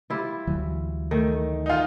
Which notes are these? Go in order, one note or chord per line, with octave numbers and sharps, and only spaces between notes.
G3 E4 F4
D2 E3 F#3
D#3 A3
D#4 F4